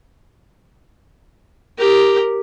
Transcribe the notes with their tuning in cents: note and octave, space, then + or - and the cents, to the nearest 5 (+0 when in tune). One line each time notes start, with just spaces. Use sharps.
G4 +0 A#4 +0